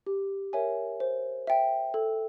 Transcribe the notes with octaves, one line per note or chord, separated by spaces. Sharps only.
G4
A#4 C#5 E5 G#5
C5
E5 G5
A4